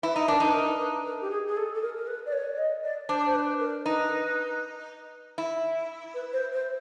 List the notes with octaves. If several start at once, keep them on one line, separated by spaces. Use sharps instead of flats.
E4 B4
D#4
D4 A#4
D#4
B4
A#4
B4
A#4
G4
G#4
G#4
A4
A4
A#4
A#4
B4
D5
C#5
D5
D#5
D5
D4 C5
C5
B4
A#4
D#4 B4
E4
B4
C5
C5